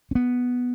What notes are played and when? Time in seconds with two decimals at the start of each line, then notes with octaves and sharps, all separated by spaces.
0.11 C#4
0.15 B3